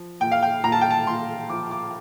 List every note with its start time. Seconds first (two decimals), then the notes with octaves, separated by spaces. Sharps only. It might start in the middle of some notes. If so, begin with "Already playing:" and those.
Already playing: F3
0.20 A#2 G5
0.32 F5
0.43 G5
0.64 A#2 A#5
0.72 A5
0.81 G5
0.90 A5
1.06 A#2 C6
1.50 F3 D6
1.71 D6